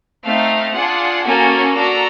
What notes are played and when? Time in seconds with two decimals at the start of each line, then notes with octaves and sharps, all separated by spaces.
0.25 A3 C4 D#4 F5
0.74 D4 F4 G#4 F#5
1.25 A#3 C#4 F#4 A4 G#5
1.76 D4 F#4 A4 A#5